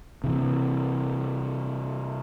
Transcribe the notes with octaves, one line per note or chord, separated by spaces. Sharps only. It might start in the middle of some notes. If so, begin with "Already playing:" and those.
C3 E3